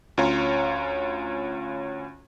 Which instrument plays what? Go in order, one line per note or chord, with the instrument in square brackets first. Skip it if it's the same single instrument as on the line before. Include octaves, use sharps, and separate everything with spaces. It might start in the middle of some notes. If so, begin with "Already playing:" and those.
[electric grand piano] D2 C#4 F4 C#5 F5 A#5